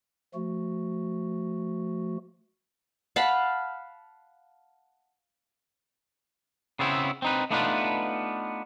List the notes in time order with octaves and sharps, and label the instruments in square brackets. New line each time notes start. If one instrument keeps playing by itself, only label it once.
[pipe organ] F3 A3 F#4
[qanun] F5 F#5 A5 B5
[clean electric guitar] C#3 B3 C4 E4
C4 D#4 B4
A3 B3 D4 D#4 F4 B4